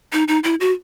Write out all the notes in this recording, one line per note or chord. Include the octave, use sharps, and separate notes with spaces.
D#4
D#4
E4
F#4